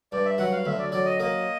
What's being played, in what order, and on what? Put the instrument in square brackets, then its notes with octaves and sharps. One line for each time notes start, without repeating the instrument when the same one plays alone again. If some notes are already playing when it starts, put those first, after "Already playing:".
[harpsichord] G2 [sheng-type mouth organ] D5
[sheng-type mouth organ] E5
[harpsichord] F#3 [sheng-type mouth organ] F#5
[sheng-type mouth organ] F5
[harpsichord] D2 [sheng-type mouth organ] E5
[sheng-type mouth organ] D5
[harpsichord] F#3 [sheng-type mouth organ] D5
[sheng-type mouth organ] D#5
[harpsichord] A#3 [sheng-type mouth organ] D#5